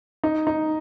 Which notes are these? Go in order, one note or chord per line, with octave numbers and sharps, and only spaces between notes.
D#4
D#4